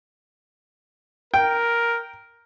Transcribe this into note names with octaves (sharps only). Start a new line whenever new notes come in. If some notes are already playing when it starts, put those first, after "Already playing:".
A#4 G5